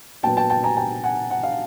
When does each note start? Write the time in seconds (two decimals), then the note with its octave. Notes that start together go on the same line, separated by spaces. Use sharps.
0.23 A#2 F#3 B3 G5 A5
0.37 G5 A5
0.50 G5 A5
0.63 G#5 A#5
0.77 G5 A5
1.04 F#5 G#5
1.31 F#5
1.43 F5